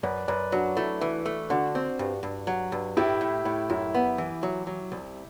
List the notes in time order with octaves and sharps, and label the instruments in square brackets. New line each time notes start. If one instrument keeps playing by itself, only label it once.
[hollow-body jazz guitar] F#2 [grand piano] B4 D5
[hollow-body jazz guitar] F#2 [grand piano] B4 D5
[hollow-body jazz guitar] F#3 [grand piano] D4 F#4
[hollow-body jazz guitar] A3 [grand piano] E4
[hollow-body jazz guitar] E3
A3
[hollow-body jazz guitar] D3 [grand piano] D4 F#4
[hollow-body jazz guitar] C4
G2
G2
F#3
G2
[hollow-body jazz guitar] A2 [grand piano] E4 G4
[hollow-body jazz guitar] A2
A2
[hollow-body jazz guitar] F#2 [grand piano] E4
[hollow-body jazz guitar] B3
E3
F#3
F#3
C2